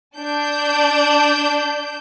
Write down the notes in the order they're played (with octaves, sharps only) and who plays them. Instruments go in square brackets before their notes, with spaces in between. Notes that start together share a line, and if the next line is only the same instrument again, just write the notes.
[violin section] D4 G6